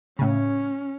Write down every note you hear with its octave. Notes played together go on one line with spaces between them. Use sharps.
A2 C#3 C#4